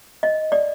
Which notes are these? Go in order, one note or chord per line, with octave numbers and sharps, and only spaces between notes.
D#5
D5